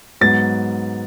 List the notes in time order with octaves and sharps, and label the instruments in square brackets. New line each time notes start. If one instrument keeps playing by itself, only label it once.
[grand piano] G#2 F#3 B3 A6